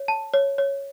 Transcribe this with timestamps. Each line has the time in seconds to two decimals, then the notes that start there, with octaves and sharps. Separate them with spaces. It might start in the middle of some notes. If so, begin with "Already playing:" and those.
Already playing: C#5
0.08 A5
0.34 C#5
0.58 C#5